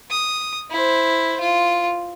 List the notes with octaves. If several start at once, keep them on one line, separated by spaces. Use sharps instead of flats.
D#6
E4 C5
F4